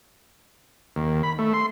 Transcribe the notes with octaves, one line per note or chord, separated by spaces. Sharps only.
D#2
B5
A3
C6